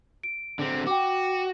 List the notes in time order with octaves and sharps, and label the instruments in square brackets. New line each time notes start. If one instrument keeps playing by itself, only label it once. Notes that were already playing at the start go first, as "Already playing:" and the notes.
[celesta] D7
[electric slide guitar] D3 C4
[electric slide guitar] F#4 [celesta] G5 D6